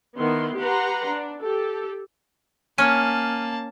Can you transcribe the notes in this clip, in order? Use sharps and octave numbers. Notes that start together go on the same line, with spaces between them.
D#3 B3 E4 C6
G4 B4 F#5 A#5 C6
D4
G4 A4
A#3 C#4 A5 F6 D#7